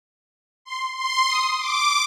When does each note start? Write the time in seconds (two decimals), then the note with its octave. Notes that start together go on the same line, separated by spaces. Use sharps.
0.65 C6
0.97 C6
1.28 D#6
1.60 D6